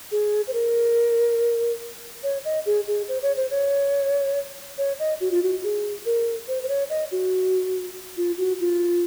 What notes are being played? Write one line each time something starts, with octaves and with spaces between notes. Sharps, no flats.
G#4
C5
A#4
C#5
D#5
G#4
G#4
C5
C#5
C5
C#5
C#5
D#5
F#4
F4
F#4
G#4
A#4
C5
C5
C#5
D#5
F#4
F4
F#4
F4